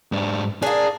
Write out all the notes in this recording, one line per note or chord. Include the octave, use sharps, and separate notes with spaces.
G#2 D4
A#3 D4 G#4